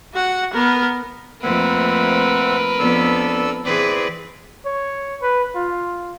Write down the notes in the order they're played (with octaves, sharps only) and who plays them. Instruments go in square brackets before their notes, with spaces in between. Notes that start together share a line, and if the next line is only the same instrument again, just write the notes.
[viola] F#4 F#5
B3 A#4
[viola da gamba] F2 A3 A#3 [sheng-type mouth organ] C4 E5 F#5 [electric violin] A#4 B4
[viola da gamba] F2 B3 [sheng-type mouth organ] D4 A4 E6
[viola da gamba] E3 G#4 B4 [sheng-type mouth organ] C4 D5
[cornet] C#5
B4
F4